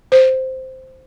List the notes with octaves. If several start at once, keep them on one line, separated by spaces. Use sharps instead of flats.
C5